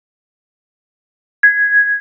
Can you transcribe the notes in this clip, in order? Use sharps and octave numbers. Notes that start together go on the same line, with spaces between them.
G#6